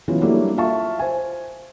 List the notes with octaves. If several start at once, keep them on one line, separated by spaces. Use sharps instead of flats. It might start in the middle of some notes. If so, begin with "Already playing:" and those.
E3 F#3 G#3 B3 C#4 F4
F#3 G3 A#3 D4 E4 A4
F4 E5 F5 A5 C#6
C5 G#5